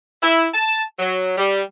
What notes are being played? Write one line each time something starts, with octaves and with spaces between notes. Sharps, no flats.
E4
A5
F#3
G3